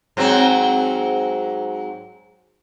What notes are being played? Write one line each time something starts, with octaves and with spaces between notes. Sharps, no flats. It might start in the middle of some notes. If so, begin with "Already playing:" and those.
G#2 F#3 C4